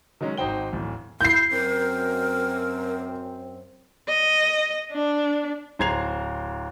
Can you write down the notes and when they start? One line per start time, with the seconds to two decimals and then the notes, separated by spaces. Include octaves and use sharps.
0.21 D#3 F#3 G#3 C#4
0.37 G#1 D#4 F#4 C5 G5 G7
0.73 D1 E2
1.21 E4 G6 C7
1.52 F#2 C4 A#4
4.08 D#5
4.92 D4
5.79 D1 C5 A#5 G#6 C7 F7